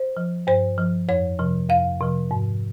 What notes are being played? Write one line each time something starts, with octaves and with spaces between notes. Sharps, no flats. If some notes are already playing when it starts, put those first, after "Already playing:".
Already playing: C5
F3
G2 C5
F3
F2 C#5
C3 F3
F2 F5
C3 F3
G#2